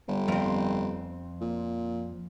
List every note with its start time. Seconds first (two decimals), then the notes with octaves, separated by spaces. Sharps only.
0.08 G1
0.28 F2 C4
1.41 A#2